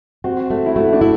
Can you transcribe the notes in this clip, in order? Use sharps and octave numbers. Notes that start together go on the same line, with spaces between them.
C4 F#4
A3
E4
A3 F#4
D4
E4